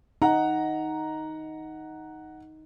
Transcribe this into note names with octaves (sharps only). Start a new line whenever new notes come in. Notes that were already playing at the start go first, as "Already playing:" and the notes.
D#4 F#5 A#5